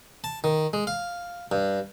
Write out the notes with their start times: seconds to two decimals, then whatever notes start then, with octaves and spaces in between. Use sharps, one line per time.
0.24 A5
0.44 D#3
0.73 G#3
0.87 F5
1.52 G2